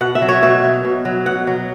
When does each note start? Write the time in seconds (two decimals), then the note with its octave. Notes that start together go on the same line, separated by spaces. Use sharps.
0.01 B2 F#5
0.15 E5
0.22 F#3
0.28 C#5
0.43 B2 E5
0.63 F#3
0.85 B2
1.05 F#3
1.26 B2 F#5
1.47 F#3